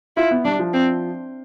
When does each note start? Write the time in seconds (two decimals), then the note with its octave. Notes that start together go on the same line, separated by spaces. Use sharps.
0.16 E4 F4
0.31 B3
0.45 G3 D4
0.59 F3
0.73 C4